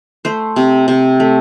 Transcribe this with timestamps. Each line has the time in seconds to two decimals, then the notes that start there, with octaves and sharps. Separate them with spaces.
0.25 A3 C5
0.56 C3
0.88 C3
1.20 A3